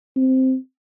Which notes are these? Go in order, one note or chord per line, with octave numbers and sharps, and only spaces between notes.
C4